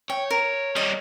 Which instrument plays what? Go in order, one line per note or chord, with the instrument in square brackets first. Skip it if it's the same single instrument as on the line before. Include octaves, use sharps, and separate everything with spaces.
[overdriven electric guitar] C#5 [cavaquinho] G5
[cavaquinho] A#4
[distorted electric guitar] G3 A#3 [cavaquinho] D#5